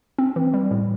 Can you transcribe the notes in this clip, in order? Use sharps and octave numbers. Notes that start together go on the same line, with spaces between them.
C4
E3
G3
A2